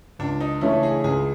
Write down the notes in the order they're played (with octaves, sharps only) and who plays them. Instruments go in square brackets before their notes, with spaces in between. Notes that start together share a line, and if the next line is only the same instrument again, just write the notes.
[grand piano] C#2 [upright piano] D4
[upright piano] D#4
[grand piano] C#3 E3 A3 C#4 [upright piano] E4
[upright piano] G#4
[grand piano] C#2 [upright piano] G#4